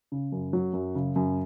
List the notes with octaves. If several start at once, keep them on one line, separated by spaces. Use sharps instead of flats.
C#3
F#2
F#3
F#2
C#3
F#2